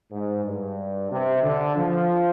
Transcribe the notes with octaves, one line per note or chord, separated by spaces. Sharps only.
G#2
G2
C3
D3
F3